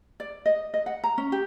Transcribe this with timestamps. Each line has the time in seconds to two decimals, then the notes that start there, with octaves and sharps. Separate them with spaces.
0.20 D5
0.46 D#5
0.74 D#5
0.86 F#5
1.04 A#5
1.18 C#4
1.32 G4